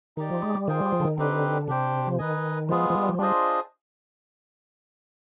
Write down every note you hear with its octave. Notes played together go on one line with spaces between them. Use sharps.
D#3 D#4 G4 D5
F3
G#3
G3
D#3 F4 G#4 C5 G5
G3
F3
D3
D#3
D3 C4 D#4 G4 B4
C3 D4 G4 C5 G5
F3
D#3 D#4 B4 D#5 G#5
F3 G#3 B3 F4 G#4
F3
G3
F3
G3 D4 F4 G#4 C5 D#5